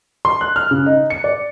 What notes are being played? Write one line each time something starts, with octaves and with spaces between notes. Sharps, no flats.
C6
F#6
F6
C#3
D#4
C#7
D5